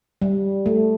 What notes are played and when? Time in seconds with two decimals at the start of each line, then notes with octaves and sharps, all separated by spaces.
0.22 G3
0.66 A3